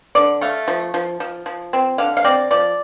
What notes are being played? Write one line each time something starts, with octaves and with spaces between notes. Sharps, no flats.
D3 D5
A3 F5
F3
F3
F3
F3
C4
D3 F5
F5
C4 D5
F3 D5